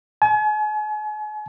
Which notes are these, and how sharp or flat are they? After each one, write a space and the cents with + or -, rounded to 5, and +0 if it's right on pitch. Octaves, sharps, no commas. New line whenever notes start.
G#5 +40